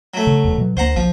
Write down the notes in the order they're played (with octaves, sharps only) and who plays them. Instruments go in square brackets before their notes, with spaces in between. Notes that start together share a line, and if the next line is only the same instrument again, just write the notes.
[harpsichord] F#3 A3
[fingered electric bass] C#3
D1 B1 E2
B2 F#3
[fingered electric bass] D2 A#3 [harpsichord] C5 F#5 A#5
[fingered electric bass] B1 [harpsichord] F3